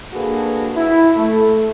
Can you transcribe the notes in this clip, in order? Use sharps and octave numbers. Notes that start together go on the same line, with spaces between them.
A#3 D4 F#4 G#4 A4 B4
E4
A3